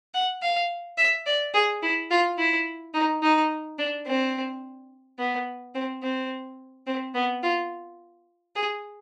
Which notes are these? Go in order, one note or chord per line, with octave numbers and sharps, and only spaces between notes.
F#5
F5
E5
D5
G#4
E4
F4
E4
D#4
D#4
D4
C4
B3
C4
C4
C4
B3
F4
G#4